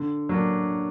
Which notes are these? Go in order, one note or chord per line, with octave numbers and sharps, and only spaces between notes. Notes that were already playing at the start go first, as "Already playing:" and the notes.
Already playing: D3
F#3 A#3 D4